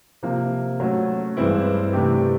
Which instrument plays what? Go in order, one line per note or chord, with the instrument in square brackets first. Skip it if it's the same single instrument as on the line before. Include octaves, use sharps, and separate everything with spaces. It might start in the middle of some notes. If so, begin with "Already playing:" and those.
[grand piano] C3 F3 A#3
F#3 A3 C#4
G2 E3 G#3 C4 E4
C3 E3 A3 D4 G4